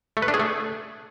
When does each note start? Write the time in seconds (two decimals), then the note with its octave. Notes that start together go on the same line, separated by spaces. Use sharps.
0.17 A3
0.22 B4
0.28 D4
0.34 G#4
0.40 A3